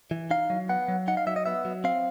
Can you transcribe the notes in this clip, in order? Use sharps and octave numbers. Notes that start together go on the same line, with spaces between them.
E3
D#4 F5
F#3
B3 F#5
F#3
D#4 F#5
F5
F#3 E5
D#5
B3 E5
F#3
C4 F5